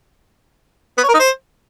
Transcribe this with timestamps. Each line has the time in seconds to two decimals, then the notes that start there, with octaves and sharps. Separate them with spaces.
0.98 B3
1.03 C#5
1.09 A#4
1.14 D#4
1.20 C5